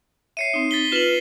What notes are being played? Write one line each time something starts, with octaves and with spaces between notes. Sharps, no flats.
C#5 E5 C7 C#7 D#7
C4 D#4
A6 B6 G7
F4 B4 E7 F#7